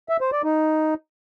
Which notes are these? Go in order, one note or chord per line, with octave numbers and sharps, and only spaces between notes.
E5
C5
D5
D#4